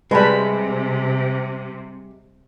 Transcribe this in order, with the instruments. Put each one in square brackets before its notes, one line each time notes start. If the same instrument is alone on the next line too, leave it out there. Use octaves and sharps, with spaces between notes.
[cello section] C3 [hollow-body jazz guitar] G3 G#3 [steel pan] B4 A5 B5